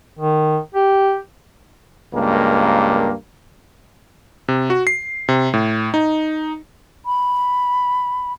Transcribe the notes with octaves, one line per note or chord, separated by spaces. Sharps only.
D#3
G4
C#2 G2 A#3
C3
F#4
C7
C3
A2
D#4
B5